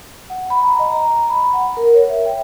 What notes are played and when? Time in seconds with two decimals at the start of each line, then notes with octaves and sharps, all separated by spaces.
0.30 F#5
0.50 B5
0.62 A#5
0.79 D#5
0.92 A#5
1.30 B5
1.53 F#5
1.77 A#4
1.94 C#5
2.09 E5
2.26 G5